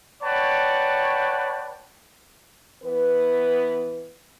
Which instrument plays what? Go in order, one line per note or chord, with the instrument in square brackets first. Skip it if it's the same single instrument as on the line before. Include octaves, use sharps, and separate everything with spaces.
[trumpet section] B4 C#5 D5 F#5 G5 A5
[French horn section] E3 B3 B4